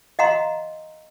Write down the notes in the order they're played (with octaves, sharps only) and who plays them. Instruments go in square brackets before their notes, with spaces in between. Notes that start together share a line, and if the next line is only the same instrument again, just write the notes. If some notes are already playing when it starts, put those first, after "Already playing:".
[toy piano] D#5 F5 F#5 A#5 C6